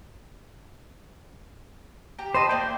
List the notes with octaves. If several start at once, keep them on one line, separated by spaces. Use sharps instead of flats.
G4 G5 A#5
C5 D#5 A5 B5 C6
A3 A#3 D4 G5